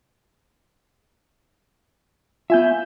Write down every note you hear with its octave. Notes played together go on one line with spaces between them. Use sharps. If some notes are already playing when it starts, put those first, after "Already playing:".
B3 F4 E5 G#5 G6